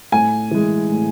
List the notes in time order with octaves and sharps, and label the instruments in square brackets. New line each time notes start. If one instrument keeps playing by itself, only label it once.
[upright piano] A2 G#5
E3 G#3
A2